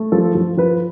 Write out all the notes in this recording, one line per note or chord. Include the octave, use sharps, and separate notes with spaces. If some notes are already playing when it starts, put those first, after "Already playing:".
Already playing: A3
F3 A4
F3
F3 B4